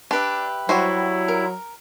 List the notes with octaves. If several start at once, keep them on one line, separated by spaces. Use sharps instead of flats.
D4 G4 B4 E5
F#3 G3 E4 F#4 C5
A#4